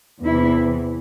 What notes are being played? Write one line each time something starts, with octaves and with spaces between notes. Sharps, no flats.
E2 C3 E3 E4